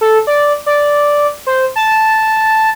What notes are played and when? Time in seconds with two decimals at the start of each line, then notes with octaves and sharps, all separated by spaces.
0.01 A4
0.27 D5
0.66 D5
1.47 C5
1.76 A5